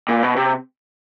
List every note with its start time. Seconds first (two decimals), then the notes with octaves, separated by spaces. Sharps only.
0.08 A#2
0.23 B2
0.36 C3